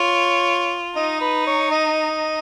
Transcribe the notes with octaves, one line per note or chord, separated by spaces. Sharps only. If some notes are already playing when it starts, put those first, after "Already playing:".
Already playing: F4 C#5
D#4 D#5
B4
C#5
D#5